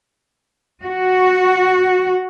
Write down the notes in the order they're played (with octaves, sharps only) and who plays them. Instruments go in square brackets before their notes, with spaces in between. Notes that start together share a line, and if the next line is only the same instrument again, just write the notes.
[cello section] F#4